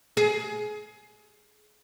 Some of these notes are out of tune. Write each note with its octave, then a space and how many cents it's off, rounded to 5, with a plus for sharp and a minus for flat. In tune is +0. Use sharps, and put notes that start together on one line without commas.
G#4 +25